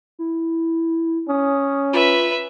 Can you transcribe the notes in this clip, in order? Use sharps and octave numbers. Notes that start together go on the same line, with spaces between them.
E4
C#4 D#6
F4 B4 E5